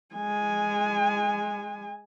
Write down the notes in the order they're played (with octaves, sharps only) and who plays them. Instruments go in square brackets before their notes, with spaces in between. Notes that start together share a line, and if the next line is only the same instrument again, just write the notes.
[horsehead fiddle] G#3 G#5